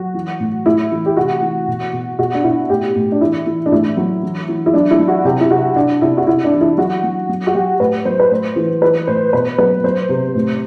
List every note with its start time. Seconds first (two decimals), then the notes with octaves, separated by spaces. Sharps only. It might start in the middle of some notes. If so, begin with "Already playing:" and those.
Already playing: F#3 F#4
0.14 E3
0.40 A2
0.66 A2 E4
0.92 E3
1.05 G4
1.17 C3 F#4
1.42 E3
1.68 B2
1.93 B2
2.18 B2 F#4
2.34 D4
2.44 B2 E4
2.69 A2 G4
2.96 A2
3.12 D4
3.21 E3 E4
3.46 E3
3.66 D4
3.72 A2 E4
3.97 F#3
4.23 E3
4.49 E3
4.66 E4
4.74 F#3 D4
4.91 E4
4.99 F#3
5.08 F#4
5.25 C3 G4
5.41 E4
5.50 C3 F#4
5.76 C3 D4
6.01 C3 E4
6.17 F#4
6.27 C3 E4
6.45 D4
6.52 E3
6.61 E4
6.77 F#3 F#4
7.04 F#3
7.29 F#3
7.47 F#4
7.54 F#3 G4
7.80 A2 B4
8.05 F#3 C5
8.20 B4
8.31 A2 C5
8.56 E3
8.82 E3 B4
9.07 A2 C5
9.33 B2 B4
9.58 F#3 B4
9.84 F#3 C5
10.09 C3
10.35 A2